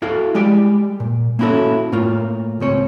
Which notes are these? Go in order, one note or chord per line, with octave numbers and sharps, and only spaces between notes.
E4 F#4 A4 F5
G3 G#3 G4 D5
A#2
A#3 C#4 E4 F#4 A4
A2 A3 A#3 F4
C#2 C4 C#5